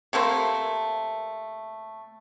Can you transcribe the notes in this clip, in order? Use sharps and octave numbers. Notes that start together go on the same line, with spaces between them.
C3 A3 A#3 C5